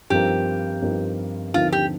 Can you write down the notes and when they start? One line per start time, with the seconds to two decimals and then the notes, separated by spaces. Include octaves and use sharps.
0.10 G2 F3 C4 D#4 G4 A#4
0.82 G2 F3 C4 D#4 A#4
1.54 D#2 D3 F3 C4 D#4 F4
1.72 G4